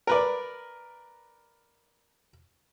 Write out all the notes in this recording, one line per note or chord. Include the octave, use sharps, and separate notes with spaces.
A#4 B4 D5